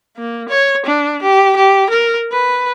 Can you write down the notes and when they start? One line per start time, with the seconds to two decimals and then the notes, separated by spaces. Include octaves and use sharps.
0.17 A#3
0.48 C#5
0.86 D4
1.22 G4
1.56 G4
1.90 A#4
2.32 B4